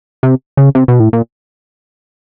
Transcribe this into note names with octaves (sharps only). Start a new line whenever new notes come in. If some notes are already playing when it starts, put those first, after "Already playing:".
C3
C#3
C3
B2
A2
A#2